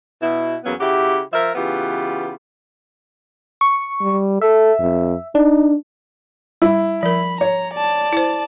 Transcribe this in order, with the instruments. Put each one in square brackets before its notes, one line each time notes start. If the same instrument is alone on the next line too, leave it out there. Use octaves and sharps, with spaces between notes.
[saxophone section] B2 E4
E2 F#3 A#3 B3 C#4
C#3 E4 F#4 G4
F3 A#4 E5
C#3 E3 B3 F4 G4
[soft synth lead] C#6
[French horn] G3
[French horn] A4 [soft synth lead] E5
[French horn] F2
[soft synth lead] D4 [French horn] D#4
[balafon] G3 [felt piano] E4
[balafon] F3 A#4 [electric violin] B5
[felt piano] C#5 [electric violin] A#5
[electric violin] D5 A5
[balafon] E4 C5